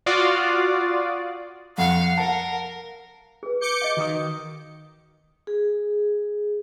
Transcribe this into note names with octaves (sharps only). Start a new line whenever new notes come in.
F4 F#4 D5 F5 D#6
F2 F5 F#5
A#4 A5
G#4 B4
D6 G6 C#7
D#5 F5
D#3 F#4 D#6
G#4